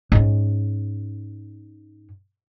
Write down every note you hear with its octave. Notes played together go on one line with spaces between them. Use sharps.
G#2 C#4